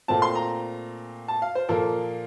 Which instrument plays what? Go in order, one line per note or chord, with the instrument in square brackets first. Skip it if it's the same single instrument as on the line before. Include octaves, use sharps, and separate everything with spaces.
[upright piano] A#2 A3 C4 A5
C6
A#5
A5
F5
C5
A#2 F3 A#3 A4